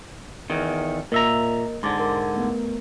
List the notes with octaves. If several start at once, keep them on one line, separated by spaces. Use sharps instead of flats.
E2 D#3
A#2 A#3 A#4 D#5 E5 A#5
G#2 D3 C6 D6 A6
A#4
A3 B3 A#4